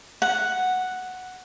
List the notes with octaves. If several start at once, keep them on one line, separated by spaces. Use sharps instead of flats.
F#5